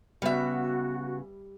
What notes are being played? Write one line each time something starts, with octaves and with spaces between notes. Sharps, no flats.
C#3 G3 B3 F#4 E5